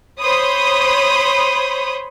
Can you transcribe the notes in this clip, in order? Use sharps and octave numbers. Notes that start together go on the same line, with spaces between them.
C5 C#5 B5 D#6